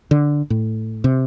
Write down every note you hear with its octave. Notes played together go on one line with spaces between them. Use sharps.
D3
A2
C3